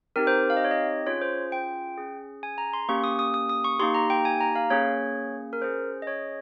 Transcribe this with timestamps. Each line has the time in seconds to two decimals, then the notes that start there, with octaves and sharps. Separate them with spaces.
0.16 C4 D#4 G4 A#4
0.27 C5
0.50 F5
0.57 D#5
0.64 C#5
0.71 D#5
1.06 C#4 F4 G#4 C#5
1.22 C5
1.52 G5
1.98 C#4 G#4
2.43 G#5
2.58 A#5
2.73 C6
2.89 A#3 C#4 G4 C#6
3.04 D#6
3.19 D#6
3.34 D#6
3.49 D#6
3.64 C#6
3.80 A#3 D#4 G4 C6
3.94 A#5
4.10 G5
4.25 G#5
4.40 A#5
4.55 F5
4.70 A#3 C#4 G#4 C#5
5.53 A#4
5.62 C#4 G#4 C5
6.02 D#5
6.07 C#5